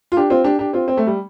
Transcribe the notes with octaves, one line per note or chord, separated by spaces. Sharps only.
F4
D4 G4
C4 F4
D4 G4
D4 G4
C4 F4
C4
A3
G3